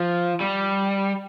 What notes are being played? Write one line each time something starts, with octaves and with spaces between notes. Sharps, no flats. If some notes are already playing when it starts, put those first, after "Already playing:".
Already playing: F3
G3